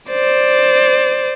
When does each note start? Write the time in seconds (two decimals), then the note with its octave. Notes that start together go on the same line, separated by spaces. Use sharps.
0.11 C5 D5